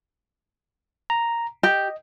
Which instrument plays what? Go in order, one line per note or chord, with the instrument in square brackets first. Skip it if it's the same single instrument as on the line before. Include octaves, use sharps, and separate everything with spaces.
[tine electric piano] A#5
[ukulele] G4 [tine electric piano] D#5